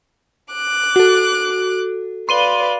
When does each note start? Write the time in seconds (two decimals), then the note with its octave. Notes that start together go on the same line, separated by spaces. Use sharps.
0.53 D6 F#6
0.96 F#4 A4
2.29 B4 D5 F5 C6 D#7 G7